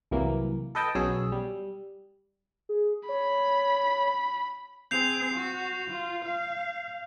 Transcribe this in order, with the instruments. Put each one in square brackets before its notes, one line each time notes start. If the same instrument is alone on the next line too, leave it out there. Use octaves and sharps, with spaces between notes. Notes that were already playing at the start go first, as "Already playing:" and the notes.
[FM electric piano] C2 E3 F#3 A#3
A4 B4 D#5 G5 A5
B1 B2 F#3 C#4 G#4 E6
G3
[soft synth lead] G#4
[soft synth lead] C#5 [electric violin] B5
[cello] C4 G#4 [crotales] G6 C7 F7
[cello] F#4
F4
F5